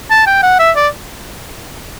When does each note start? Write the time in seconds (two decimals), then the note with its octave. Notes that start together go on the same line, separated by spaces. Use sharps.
0.11 A5
0.27 G5
0.43 F#5
0.59 E5
0.76 D5